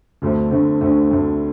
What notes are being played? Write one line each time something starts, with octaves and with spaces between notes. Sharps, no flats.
D2 D3 A3 C4
D2 D3 A3 C4
D2 D3 A3 C4
D2 D3 A3 C4